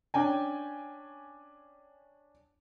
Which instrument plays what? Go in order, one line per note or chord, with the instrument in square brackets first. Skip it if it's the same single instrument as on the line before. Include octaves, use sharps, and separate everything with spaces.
[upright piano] C#4 D4 G5 G#5